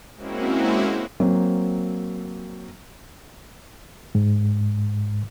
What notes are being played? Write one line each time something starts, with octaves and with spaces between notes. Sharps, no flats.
G#3 A#3 C4 C#4 E4 F#4
F#3 A#3 C4
G#2